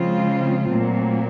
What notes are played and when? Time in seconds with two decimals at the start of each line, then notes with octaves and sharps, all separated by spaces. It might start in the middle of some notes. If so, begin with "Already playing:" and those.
Already playing: C#3 F3 G#3 C4 F4
0.68 A#2 F#3 A3 C4